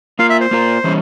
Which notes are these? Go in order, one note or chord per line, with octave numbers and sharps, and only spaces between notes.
A#3 F4 A#4 F5
E5
C5
A#3 F4 A#4
E3 G3 C#4